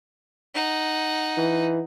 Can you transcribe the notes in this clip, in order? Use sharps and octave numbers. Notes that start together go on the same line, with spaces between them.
D#4 F#5
E3